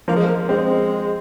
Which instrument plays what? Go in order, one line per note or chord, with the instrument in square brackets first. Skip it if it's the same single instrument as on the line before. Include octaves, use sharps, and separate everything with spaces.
[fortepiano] F3 [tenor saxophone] A#3
[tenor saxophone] G#3
A#3
[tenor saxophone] G#3 [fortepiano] C4